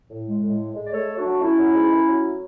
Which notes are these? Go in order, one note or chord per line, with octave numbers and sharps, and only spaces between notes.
A2
G#3
A2
G#3
G#3
D5
A3 A4 C#5
A3
D4 F#4
F#3
A3 C#4 E4
F#3
G#2
A3
F#3